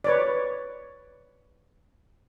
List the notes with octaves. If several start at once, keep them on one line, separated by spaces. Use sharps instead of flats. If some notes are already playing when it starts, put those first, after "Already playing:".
B4 C#5 D5